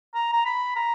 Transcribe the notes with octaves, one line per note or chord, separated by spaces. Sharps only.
A#5
A#5
B5
A#5